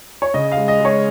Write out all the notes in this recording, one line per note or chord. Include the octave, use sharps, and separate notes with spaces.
C#5
C#3 D#5
F5
G#3
D#5
G#3 C#5